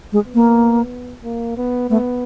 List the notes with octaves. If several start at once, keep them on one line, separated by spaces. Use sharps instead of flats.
G#3
B3
A#3
A#3
B3
A3 B3